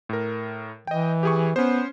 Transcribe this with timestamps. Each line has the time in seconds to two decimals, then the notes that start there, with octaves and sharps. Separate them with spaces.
0.09 A2 A#4
0.87 E3 D#5 G5
1.23 G4 G#4 C#6
1.56 B3 C#4 C5